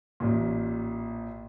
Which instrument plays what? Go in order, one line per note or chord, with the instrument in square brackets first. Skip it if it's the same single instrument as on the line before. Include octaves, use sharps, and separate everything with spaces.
[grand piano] A1 A#2